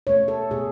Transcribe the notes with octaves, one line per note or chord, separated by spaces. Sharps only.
B2 A3 C#5
A4
B2 A3 G#4